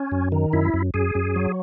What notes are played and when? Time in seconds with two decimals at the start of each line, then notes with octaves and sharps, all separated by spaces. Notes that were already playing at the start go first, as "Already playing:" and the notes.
Already playing: C#4
0.12 F#2
0.32 D#3
0.53 F#2 E4
0.74 F#2
0.94 F#2 G#4
1.15 F#2
1.36 F#3